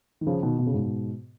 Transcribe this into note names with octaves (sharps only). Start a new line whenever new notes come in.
D#3
C#3 F3
B2 D#3
B2
C#3
G#2 B2